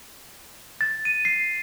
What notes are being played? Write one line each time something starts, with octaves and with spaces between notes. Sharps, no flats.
A6
D#7
C7